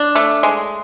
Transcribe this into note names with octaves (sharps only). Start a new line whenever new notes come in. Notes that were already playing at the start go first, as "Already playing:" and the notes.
Already playing: D4
A3
G#3